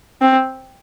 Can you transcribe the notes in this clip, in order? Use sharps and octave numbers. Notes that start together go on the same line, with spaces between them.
C4